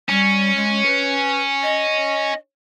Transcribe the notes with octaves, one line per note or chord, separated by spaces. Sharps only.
G3 C#4
G#3
B4
D#5